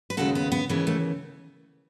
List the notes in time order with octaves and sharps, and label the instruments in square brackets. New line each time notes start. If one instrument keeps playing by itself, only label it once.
[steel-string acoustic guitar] B4
D#2 C#3 G#3 F#4 A4
B3
B3
D#2 C#3 E3 G#3 B3
A3